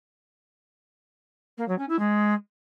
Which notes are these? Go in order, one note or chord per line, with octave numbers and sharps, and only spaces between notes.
A#3
F#3
C#4
E4
G#3